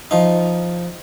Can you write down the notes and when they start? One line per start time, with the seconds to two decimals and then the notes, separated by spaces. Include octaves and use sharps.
0.11 F3 D#4